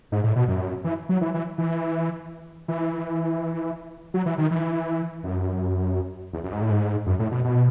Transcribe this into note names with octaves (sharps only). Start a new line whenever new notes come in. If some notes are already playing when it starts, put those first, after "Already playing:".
G#2
A2
B2
F#2
E3
F#3
E3
E3
E3
E3
F#3
E3
D#3
E3
F#2
E2
F#2
G#2
A2
G#2
F#2
A2
B2
B2